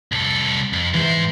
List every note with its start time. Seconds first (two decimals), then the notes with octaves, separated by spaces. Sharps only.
0.12 C2 A4
0.73 F2
0.94 G#2 E3 C5